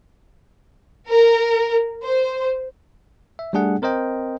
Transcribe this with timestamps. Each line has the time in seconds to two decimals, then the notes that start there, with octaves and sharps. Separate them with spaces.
1.08 A#4
2.03 C5
3.39 E5
3.53 G3 A3 D4 G#4 F#5
3.82 C4 A#4 C5 D#5 G5